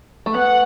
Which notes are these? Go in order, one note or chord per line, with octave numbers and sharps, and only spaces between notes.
A3
B3 F#5